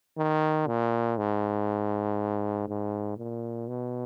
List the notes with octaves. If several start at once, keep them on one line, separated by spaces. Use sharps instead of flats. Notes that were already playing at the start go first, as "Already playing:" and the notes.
D#3
A#2
G#2
G#2
A#2
B2